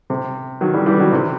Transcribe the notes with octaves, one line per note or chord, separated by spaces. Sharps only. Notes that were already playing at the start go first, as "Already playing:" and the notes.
C3
D#3 F#3
E3 G3
E3 G3
D#3 F#3
C3 E3